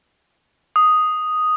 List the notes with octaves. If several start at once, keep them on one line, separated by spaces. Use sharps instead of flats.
D#6